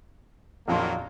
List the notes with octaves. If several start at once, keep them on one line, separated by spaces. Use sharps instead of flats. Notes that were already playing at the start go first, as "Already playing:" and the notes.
A#1 F2 D#3 F#3 A#3 C6